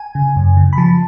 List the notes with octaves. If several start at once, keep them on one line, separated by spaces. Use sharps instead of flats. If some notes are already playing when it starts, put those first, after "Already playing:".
Already playing: G#5
C#3
F#2
C#3
B5
F3 A5